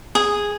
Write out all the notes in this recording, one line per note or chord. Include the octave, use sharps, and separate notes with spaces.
G#4